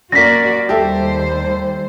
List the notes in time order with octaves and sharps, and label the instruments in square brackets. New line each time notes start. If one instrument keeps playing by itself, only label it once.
[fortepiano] F#2 A#3 [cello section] F#4 D5 [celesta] A#6 B6
[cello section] D#2 G3 C5 [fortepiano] G4 A4 E5